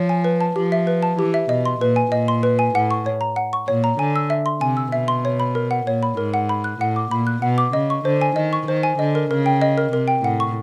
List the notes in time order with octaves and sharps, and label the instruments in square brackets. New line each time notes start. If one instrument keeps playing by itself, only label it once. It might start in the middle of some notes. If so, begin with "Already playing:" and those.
Already playing: [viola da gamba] F3 [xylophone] C#5
[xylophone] G#5
B4
A5
[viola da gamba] F3 [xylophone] G4
[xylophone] E5
B4
A5
[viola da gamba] E3 [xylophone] G4
[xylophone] E5
[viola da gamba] B2 [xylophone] D#5
[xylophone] C6
[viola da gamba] A#2 [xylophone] B4
[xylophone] G#5
[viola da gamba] A#2 [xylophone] D#5
[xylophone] C6
B4
G#5
[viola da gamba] A2 [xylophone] F#5
[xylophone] C#6
C#5
A#5
F#5
C#6
[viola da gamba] A#2 [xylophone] C#5
[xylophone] A#5
[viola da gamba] D3 [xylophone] G#5
[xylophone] E6
E5
C6
[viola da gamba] C3 [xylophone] G#5
[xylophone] E6
[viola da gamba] B2 [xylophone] E5
[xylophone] C6
C#5
B5
A#4
F#5
[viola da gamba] A#2 [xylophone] C#5
[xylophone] B5
[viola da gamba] G#2 [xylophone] A#4
[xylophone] F#5
B5
F#6
[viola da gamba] A2 [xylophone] F#5
[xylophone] D6
[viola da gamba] A#2 [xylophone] B5
[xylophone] F#6
[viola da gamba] B2 [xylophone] F#5
[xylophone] D6
[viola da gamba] C#3 [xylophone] D#5
[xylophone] C#6
[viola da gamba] D3 [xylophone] C5
[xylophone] G#5
[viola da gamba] D#3 [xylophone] D#5
[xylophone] C#6
[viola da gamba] D#3 [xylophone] C5
[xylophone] G#5
[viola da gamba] D3 [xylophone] D#5
[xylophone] A#4
[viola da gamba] C#3 [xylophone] A#4
[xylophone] G5
D#5
A#4
[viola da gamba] C3 [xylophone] A#4
[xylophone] G5
[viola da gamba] A2 [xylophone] F#5
[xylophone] C#6